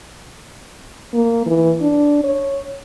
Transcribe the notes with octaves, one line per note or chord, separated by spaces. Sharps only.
A#3
E3
D4
C#5